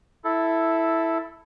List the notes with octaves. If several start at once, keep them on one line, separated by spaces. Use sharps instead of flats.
E4 A4